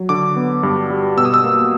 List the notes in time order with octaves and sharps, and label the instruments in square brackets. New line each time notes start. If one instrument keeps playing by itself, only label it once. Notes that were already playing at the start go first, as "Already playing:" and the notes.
Already playing: [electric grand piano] F#3
D3 D6
B3
G2
G3
B2 E6
D#6
E6
A#3